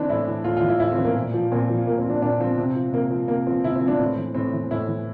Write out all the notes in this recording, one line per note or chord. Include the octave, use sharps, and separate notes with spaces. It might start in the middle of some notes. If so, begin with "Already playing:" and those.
Already playing: E3 C4 D4
A2 E4
E3
A2 F4
F4
E3
E4
A2 E4
C4
E3
A#3
A#2
F3
A#2 C4
F3
A#2 A#3
C4
F3
D4
A#2 D4
F3 C4
C3
F3
C3 A#3
F3
C3 A#3
F3 C4
C3 E4
C4
F3
D4
A2 C4
E3
A2 C4
E3
A2 E4
E3